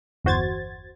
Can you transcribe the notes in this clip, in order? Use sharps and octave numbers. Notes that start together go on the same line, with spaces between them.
G1 E2 F#4 C5 G#6 A6